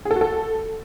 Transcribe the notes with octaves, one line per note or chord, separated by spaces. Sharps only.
G#4
A4
F#4
A4